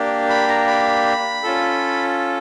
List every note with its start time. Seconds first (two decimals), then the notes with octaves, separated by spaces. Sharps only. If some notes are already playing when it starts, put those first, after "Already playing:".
Already playing: A#3 D4 G4
0.29 B5
0.48 A#5
0.67 B5
1.43 C#4 F4 A4